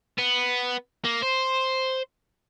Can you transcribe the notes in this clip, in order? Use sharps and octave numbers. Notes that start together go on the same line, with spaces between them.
B3
A#3
C5